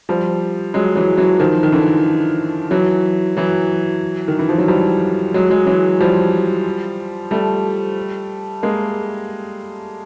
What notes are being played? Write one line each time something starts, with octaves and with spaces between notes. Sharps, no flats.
F3 G3
F#3 G#3
E3 F#3
E3 F#3
D#3 F3
D#3
D3 E3
E3 F#3
E3 F#3
D#3
E3
F3
F#3
F3 G3
F#3 G#3
F#3 G#3
E3 F#3
F3 G3
G3 A3
G#3 A#3